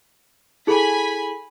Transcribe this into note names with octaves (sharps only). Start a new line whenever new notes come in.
E4 G#4 A4 G#5 B5 B6